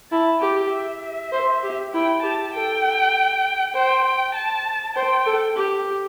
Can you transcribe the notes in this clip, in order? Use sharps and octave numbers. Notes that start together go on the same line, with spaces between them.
E4 A5
G4 G5
E5
C5
G4
E4 G5
G4 A5
A4 G5
C5 G5
G5
A5
C5 G5
A4
G4